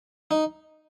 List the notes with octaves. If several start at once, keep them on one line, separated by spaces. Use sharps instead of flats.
D#4